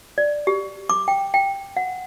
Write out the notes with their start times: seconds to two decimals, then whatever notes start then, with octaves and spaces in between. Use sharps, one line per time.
0.18 D5
0.47 G4
0.90 D6
1.08 G5
1.34 G5
1.77 F#5